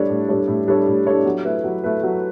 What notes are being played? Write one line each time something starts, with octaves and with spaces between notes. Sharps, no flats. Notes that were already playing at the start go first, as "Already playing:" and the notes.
Already playing: G3 D4 A4 C#5
A2
G3 D4 A4 C#5
A2
G3 D4 A4 C#5
A2
G3 D4 A4 C#5
F#3
A3 E4 B4
F#3
A3 E4 B4
F#3